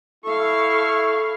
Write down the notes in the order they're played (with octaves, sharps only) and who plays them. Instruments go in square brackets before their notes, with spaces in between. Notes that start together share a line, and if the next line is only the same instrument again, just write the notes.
[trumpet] E4 [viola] A4 F5 [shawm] C#6